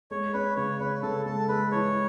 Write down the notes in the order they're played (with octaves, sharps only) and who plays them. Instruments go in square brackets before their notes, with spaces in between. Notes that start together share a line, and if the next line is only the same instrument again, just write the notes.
[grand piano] G#3 [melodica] C#5
[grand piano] C#4 [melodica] B4
[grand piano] C#3 [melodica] C#5
[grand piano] C#4 [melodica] B4
[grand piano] C#3 [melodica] A4
[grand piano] G#3 [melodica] A4
[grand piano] G#3 [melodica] B4
[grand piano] E3 [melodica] C#5